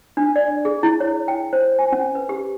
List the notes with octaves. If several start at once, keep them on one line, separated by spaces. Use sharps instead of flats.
D4
D5
G#4
E4
C#5
G5
C5
G#5
C#4
B4
G4